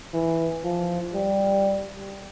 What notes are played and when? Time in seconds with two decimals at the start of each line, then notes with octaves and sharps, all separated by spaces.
0.14 E3
0.64 F3
1.14 G3